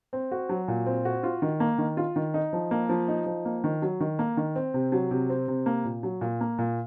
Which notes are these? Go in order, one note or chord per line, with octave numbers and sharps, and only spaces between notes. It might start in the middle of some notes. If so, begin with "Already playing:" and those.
C4
F#4
F#3
A#2
C4
F#4
F4
D#3
A#3
D#3
F4
D#3
D#4
F3
A#3
F3
D#4
F3
A#3
D#3
F#3
D#3
A#3
D#3
C4
C3
F#3
C3
C4
C3
A#3
A#2
F#3
A#2
A#3
A#2